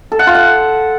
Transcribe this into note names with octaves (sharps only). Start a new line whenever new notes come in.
A4
F#5
F4
F#5